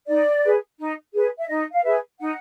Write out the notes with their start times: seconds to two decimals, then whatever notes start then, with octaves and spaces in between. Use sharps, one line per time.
0.07 D#4 D5
0.43 G#4 B4
0.78 D#4
1.13 G#4 B4
1.39 E5
1.48 D#4 D#5
1.72 F5
1.84 G#4 B4 E5
2.19 D#4 F#5